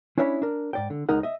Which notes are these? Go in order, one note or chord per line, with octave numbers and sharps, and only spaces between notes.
C#4 D4 E4 C#5 F#5 B5
D4 A#4
G#2 D5 G5
D3
C#2 G#3 D#4 A#4 F#5
D#5 E5